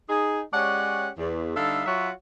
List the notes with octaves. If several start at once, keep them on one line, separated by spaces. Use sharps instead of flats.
D#4 G#4
G#3 C#4 G4 C#5 D5 F#5
E2
D3 G3 D#4 A4 E5 F5
F#3 F4 F#4 C#5 E5 F#5